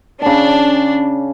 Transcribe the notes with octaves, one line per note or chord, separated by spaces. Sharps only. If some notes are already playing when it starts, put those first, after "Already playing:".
C#3 D4 A5